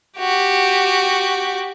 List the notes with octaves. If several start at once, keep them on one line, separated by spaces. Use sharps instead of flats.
F#4 G4